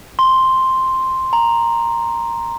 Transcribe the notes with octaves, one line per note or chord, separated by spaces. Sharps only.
C6
A#5